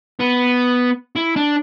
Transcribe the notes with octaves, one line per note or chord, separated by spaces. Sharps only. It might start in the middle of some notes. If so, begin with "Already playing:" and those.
B3
E4
D4